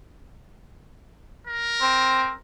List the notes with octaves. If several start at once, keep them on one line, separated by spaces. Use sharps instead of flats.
A#4
C4